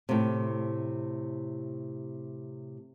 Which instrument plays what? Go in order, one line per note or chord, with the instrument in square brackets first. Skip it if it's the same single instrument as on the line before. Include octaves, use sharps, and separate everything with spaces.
[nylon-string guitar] A2 C3